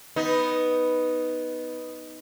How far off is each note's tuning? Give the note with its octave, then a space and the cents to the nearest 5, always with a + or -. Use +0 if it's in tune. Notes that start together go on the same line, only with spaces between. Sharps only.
B3 +0 D#4 +0